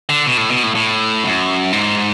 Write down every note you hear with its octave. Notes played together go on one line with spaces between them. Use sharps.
D3
B2
A2
B2
A2
A2
F#2
G#2